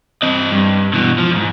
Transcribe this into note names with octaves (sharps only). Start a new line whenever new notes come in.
C4 D#5
G2
B2 E3
F3
F2 G#2